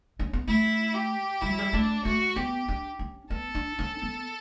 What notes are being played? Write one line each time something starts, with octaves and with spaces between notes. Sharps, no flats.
C#4
B3
A3 E4
G4
G3 E4
F#3
G3
A3 D4
A3 F#4
B3 G4
D4
C#4
B3 A4
D4
C#4
B3